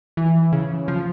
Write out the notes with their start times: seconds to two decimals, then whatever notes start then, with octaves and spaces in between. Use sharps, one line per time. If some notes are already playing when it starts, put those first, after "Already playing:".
0.17 E3
0.52 C#3
0.88 F3